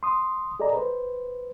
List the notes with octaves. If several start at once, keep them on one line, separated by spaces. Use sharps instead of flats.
C6 D#6
G#4 A4 D5 D#5 A#5
B4 C5